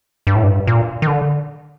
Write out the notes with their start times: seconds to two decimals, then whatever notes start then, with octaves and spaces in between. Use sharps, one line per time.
0.27 G2
0.36 A2
0.44 G2
0.67 A#2
1.02 D#3
1.07 D3